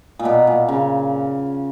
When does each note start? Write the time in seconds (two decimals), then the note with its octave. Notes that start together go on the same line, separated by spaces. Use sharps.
0.19 A#2
0.25 B2
0.47 A#2
0.68 C#3